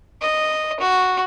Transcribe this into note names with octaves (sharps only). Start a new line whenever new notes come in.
D#5
F#4